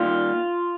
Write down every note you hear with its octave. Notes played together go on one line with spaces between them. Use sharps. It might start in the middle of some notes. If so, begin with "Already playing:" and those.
Already playing: D#2 D#3 G3 F4